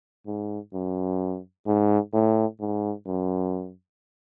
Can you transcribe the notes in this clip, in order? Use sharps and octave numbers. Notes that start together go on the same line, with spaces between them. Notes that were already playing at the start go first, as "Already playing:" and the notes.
G#2
F#2
G#2
A2
G#2
F#2